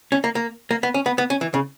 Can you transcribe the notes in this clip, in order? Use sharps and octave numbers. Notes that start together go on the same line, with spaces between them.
C#4
A#3
A#3
A#3
B3
C#4
B3
B3
C#4
E3
C#3